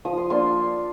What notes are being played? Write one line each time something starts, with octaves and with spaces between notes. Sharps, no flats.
F3 D#6
C6
A#3 D4 F4 C6